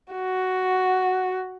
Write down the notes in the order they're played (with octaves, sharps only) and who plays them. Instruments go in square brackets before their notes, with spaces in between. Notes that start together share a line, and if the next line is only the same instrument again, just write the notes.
[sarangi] F#4